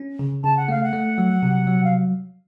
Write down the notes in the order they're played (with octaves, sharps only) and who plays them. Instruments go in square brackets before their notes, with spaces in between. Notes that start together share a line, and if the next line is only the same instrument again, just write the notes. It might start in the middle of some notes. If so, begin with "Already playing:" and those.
Already playing: [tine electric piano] C#4
C#3
[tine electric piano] C#3 [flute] A5
[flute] F#5
[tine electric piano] A3 [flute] F5
[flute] F#5
[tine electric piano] A3
F#3
C3
F#3
[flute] F5